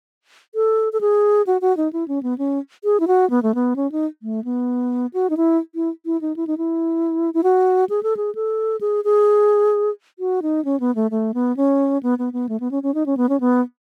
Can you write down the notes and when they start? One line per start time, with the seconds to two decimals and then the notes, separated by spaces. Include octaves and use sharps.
0.55 A4
0.93 A4
1.01 G#4
1.47 F#4
1.61 F#4
1.77 D#4
1.93 E4
2.08 C#4
2.23 B3
2.38 C#4
2.84 G#4
3.00 E4
3.07 F#4
3.30 B3
3.43 A3
3.55 B3
3.76 C#4
3.92 D#4
4.23 A3
4.44 B3
5.14 F#4
5.30 D#4
5.37 E4
5.75 E4
6.06 E4
6.21 D#4
6.36 E4
6.47 D#4
6.58 E4
7.34 E4
7.43 F#4
7.89 G#4
8.03 A4
8.17 G#4
8.35 A4
8.81 G#4
9.04 G#4
10.19 F#4
10.42 D#4
10.65 C#4
10.80 B3
10.95 A3
11.11 A3
11.34 B3
11.57 C#4
12.03 B3
12.19 B3
12.33 B3
12.49 A3
12.60 B3
12.71 C#4
12.83 C#4
12.94 D#4
13.06 C#4
13.17 B3
13.29 C#4
13.40 B3